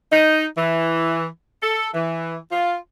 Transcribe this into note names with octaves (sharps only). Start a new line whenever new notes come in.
D#4
E3
A4
E3
F4